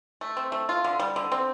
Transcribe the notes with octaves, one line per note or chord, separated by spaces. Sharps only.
A3
C4
A3
F4
D3
G3
D3
C4